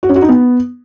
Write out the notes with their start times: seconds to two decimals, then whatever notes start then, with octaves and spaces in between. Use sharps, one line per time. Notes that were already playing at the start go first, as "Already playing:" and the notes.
0.03 F#4
0.09 C#4
0.16 F#4
0.22 D#4
0.29 B3